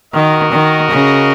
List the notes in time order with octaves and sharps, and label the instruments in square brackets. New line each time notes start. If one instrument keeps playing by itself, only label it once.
[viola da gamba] D#3 [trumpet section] F#4 A#4 D#5
[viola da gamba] D#3
C#3